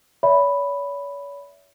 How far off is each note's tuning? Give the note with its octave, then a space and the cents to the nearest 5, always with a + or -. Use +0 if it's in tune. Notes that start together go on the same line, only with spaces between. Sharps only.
C#5 +40 E5 +0 B5 +0